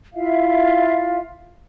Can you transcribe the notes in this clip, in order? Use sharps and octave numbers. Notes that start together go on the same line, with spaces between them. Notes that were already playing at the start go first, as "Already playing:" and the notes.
E4 F4 E5 F5